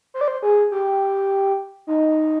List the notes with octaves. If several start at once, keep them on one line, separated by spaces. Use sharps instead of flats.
C5
D5
C5
G#4
G4
D#4